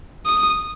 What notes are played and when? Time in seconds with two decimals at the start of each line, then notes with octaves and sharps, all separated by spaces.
0.26 D#6